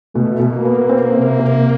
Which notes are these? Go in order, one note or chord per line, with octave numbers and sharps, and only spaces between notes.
B2 A3
B2
A#3
B3
C4
C3
C3